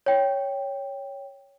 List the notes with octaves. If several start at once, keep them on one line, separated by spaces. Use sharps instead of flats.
C#5 G5